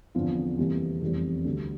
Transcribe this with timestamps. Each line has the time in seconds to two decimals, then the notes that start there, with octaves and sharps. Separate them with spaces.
0.15 E2 D3 F3 C4 F4
0.58 F2 C3 E3 G3 A#3
1.01 F1 E2 E3 G3 C4
1.45 D2 D3 G3